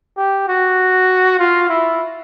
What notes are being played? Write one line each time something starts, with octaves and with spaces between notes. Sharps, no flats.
G4
F#4
F4
E4